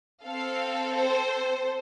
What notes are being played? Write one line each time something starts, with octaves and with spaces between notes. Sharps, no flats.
C4 A4 F5
C5